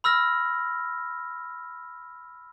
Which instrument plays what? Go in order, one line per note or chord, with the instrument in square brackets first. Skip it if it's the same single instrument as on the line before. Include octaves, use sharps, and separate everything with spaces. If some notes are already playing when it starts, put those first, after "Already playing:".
[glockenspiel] B5 E6 F6 A#6